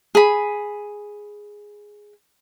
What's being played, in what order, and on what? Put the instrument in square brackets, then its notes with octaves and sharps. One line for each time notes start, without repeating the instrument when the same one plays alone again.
[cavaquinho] G#4 B5